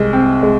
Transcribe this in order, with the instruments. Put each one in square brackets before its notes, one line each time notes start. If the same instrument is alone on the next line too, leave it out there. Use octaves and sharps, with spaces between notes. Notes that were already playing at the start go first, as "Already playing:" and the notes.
Already playing: [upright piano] C2 G#3
C4
G#3